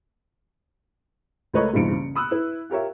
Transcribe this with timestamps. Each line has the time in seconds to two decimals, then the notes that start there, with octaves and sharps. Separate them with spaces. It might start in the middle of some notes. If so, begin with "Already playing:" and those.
1.54 C#2 A3 A#4 B4 C#5 D#5
1.74 F#1 B1 E2 G2 C#7 D7
1.91 C#3
2.16 B5 D#6 E6 F#6
2.31 E4 B4
2.70 F4 G4 A#4 C#5 E5